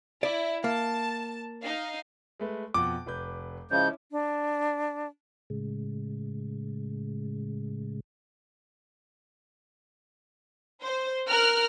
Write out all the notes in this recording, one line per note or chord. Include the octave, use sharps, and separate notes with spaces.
E4 D5
A#3 A5
D#4 F5
G#3 A3 B4
F2 B2 F#5 D6
F1 B4 G6
C#3 F3 G#3 C#4 E4 G6
D4
A2 C#3 G#3
C5
A#4 F6 F#6